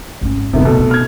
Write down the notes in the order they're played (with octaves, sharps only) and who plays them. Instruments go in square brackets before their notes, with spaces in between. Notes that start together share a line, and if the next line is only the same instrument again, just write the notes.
[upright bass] G#1 C#4
[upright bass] F1 G2 [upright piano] C3 D#3 B3
[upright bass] C2 [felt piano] B2 [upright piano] A3 A4
[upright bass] B3
[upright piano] F6 G#6